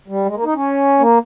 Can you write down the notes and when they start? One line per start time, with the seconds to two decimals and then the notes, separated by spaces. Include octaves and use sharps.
0.08 G3
0.26 G#3
0.35 A#3
0.44 D#4
0.54 C#4
0.99 A#3